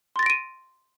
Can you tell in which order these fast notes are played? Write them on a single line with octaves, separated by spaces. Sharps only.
C6 A6 A#6 D7 D#7